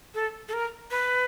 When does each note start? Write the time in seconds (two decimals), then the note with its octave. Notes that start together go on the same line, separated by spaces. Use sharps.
0.14 A4
0.48 A4
0.53 A#4
0.91 B4